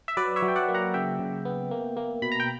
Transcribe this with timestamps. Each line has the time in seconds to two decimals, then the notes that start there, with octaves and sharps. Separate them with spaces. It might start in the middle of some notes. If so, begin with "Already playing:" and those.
0.08 E5
0.17 F#3 B4 D5
0.36 C#5 E5
0.42 F#3
0.48 G5
0.56 D5 F#5
0.68 A#3
0.74 F#5 A#5
0.94 C#3 E5 G5
1.19 C#3
1.45 B3
1.71 A#3
1.97 A#3
2.22 B2 B5
2.32 A#5
2.40 G5